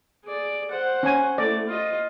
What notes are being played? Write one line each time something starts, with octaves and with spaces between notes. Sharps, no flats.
G#4 D5
C5 F#5
C#4 G#5
A3 E4 D5
F4 D#5